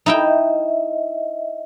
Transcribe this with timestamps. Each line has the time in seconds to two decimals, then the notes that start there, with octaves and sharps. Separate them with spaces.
0.06 D#4 E4 D#5 E5 G5